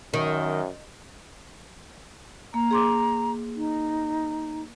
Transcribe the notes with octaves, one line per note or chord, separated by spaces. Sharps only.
F#2 D#3
A#3 A#5
G#4 C6 D6
D#4